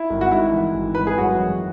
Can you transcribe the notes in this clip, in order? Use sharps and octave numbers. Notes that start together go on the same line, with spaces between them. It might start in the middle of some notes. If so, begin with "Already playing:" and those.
Already playing: E4
G#1
F#4
G#2 E4
E3
G#1
G#1 B4
G#4
F#2 F#4
E3